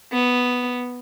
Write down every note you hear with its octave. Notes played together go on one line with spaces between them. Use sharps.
B3